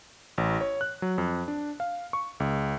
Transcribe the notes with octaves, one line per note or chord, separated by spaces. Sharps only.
A1
C#5
F#6
F#3
F2
D4
F5
C#6
C#2